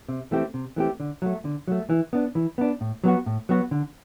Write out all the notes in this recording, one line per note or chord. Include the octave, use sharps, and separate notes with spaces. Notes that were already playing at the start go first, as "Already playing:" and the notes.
C3
E3 A3 C4 G4
C3
E3 A3 C4 G4
D3
F#3 A3
D3
F#3 A3
E3
B3 D4
E3
B3 D4
A2
F#3 B3 F#4
A2
F#3 B3 F#4
D3